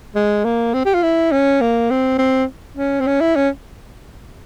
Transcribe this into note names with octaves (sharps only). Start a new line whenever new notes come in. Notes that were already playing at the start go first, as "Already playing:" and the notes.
G#3
A#3
C4
G4
F4
E4
C#4
A#3
C4
C4
C#4
C4
C#4
E4
C#4